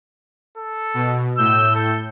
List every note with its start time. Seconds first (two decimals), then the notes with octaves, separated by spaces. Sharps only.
0.57 A4
0.94 B2
1.38 A2 E6 G6
1.75 A4